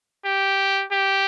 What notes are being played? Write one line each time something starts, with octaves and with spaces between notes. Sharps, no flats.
G4
G4